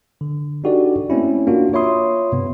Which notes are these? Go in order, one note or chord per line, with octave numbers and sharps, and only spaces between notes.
D3
D4 D#4 F#4 G4 A4 D5
A3 A#3 C4 C#4 E4
A#3 D4 F4 F#4
F4 C#5 E5 B5 C6 D#6
G2 C3 B3